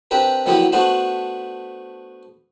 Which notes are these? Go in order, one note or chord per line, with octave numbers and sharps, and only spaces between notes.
C4 D4 G4 A#4 B4
D3 F#3 A#3 B3 E4 G4
A3 B3 D4 F#4 C5